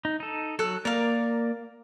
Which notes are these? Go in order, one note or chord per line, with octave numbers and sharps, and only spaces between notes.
D#4
D#4 A4
F#3 A4 F#6
A#3 A#4 D5 F5